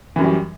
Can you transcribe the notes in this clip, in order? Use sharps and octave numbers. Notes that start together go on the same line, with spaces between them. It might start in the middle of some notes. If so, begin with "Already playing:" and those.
F#2 E3 F#3 G3